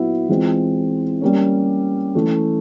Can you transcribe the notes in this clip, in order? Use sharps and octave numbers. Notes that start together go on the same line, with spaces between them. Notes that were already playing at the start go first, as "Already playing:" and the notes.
Already playing: A#2 F#3 B3 E4
E3 G#3 C4 F4
G3 A#3 C#4
E3 A3 C#4